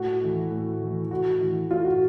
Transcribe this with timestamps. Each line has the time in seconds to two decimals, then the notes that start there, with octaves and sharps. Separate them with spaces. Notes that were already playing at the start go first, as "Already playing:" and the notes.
Already playing: A2 F#4
0.20 E3 A3
0.51 A2
0.81 E3 A3
1.11 A2 F#4
1.41 E3 A3
1.70 A2 F4
1.85 F#4